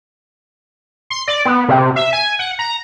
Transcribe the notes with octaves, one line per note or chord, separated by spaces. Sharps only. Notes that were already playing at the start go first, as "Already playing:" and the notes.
C6
D5
B3
C3
E5
G#5
F#5
A#5